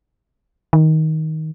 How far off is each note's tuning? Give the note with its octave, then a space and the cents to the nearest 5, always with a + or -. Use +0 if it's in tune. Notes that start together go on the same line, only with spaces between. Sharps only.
D#3 +15